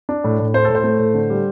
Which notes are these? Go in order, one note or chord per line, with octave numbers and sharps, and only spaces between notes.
D4
A2
A2
A3 C5
A2 A4
C5
A3
A2
D3
G3